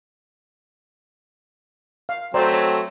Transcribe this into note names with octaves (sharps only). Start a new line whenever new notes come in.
F5
F#3 A3 C4 C5 D5 A#5
C#5